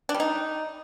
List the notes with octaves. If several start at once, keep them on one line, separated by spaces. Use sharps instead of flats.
D4
G3
D#4